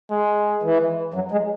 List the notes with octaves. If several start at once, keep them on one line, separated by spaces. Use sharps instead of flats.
G#3
E3
F#2 F#3
G#3